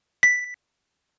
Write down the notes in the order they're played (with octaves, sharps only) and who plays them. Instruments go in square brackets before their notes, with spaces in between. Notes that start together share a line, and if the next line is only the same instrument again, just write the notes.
[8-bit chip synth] B6